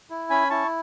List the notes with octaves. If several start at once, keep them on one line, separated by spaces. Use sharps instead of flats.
E4
C#4 G#5 B5
E4 A5 C#6